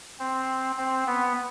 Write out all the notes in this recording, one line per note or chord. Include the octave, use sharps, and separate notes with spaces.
C4
C4
B3